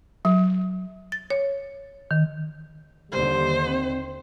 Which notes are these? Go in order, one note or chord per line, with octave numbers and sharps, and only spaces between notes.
F#3
A6
C#5
D#3
D#2 D3 G3 C5
C4